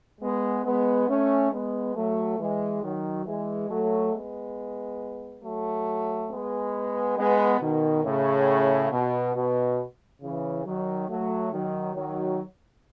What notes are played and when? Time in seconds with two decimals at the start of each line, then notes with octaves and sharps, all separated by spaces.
0.21 G#3 B3
0.65 G#3 B3
1.09 A3 C#4
1.52 G#3 B3
1.95 F#3 A3
2.39 E3 G#3
2.82 D#3 F#3
3.26 E3 G#3
3.69 F#3 A3
4.13 G#3 B3
5.43 F#3 A3
6.30 G#3 B3
7.17 G#3 B3
7.60 B2 D#3
8.04 A2 C#3
8.91 B2
9.35 B2
10.22 C#3 E3
10.65 D#3 F#3
11.08 F#3 A3
11.52 D#3 F#3
11.95 D#3 F#3